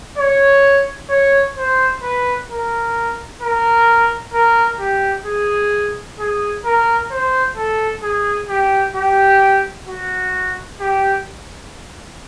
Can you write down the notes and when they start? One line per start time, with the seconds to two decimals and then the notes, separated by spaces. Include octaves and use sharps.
0.18 C#5
1.10 C#5
1.57 C5
2.02 B4
2.49 A#4
3.42 A#4
4.34 A#4
4.79 G4
5.25 G#4
6.19 G#4
6.65 A#4
7.11 C5
7.57 A4
8.03 G#4
8.49 G4
8.95 G4
9.88 F#4
10.80 G4